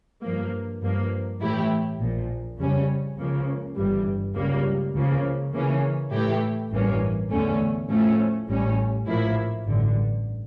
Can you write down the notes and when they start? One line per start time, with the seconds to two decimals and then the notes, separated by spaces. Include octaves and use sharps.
0.22 G2 F3 A#3
0.82 G2 F3 A#3
1.40 A2 E3 A3 E4 G4
1.99 A#1 A#2 F3
2.58 F2 C#3 G3 C#4
3.17 C#2 C#3 F3 A#3
3.75 G1 G2 E3 G3
4.35 C#2 C#3 G3 A#3
4.94 C#2 C#3 F3 A#3
5.53 C#3 E3 A#3 C#4
6.11 A2 E3 A3 E4 G4
6.70 A1 G2 E3 A#3 C#4
7.30 E2 D3 A3 C#4
7.89 A2 F3 A3 C#4
8.48 A1 A2 G3 C#4
9.06 A#1 A2 F3 A#3 E4
9.65 A1 G2 D3